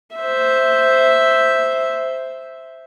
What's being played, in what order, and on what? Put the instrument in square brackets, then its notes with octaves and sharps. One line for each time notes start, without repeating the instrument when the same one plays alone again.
[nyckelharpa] C5 E5